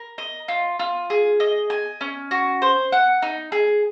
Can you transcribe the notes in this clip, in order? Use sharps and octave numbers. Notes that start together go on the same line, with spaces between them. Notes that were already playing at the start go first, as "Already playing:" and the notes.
Already playing: A#4
D#5
F4
F4
G#4
D#5
G#5
C#4
F#4
C5
F#5
D#4
G#4